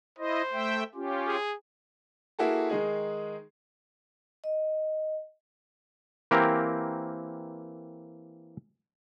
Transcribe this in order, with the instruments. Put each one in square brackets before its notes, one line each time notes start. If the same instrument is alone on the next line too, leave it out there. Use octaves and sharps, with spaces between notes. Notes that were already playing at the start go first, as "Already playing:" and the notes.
[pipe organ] E4 D#5 [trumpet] C5
[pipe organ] A3 E5 G5
C#4 F4 G4
[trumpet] G#4
[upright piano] A#3 E4 F#4 G#4 A4
D#3 G#3 D#4 G#4
[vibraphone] D#5
[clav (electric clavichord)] E3 A#3 C4 G4 A#4